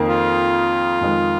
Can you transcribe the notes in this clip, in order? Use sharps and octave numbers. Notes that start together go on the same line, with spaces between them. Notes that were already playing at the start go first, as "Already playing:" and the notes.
Already playing: F2 D#3 A#3
F4
F2 D#3 G#3